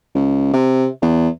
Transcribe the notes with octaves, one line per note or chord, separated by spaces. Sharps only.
C#2
C3
E2